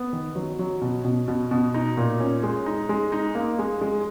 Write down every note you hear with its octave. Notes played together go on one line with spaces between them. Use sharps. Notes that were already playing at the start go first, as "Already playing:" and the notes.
Already playing: B3
D#3
F#3
F#3
B2
B2
B2
B2
D#4
A#2
C#4
G#3
D#4
G#3
D#4
A#3
G#3
G#3